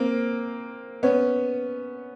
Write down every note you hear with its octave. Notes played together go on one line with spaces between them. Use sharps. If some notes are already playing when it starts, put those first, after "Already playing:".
Already playing: A#3 C4
B3 C#4